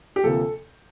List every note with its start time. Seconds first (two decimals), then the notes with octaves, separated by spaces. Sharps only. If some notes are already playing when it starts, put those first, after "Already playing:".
0.16 G4
0.24 D2 C3 F3 A#3 A4